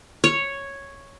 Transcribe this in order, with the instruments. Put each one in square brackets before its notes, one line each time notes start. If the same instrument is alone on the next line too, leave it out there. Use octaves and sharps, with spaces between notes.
[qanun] C#5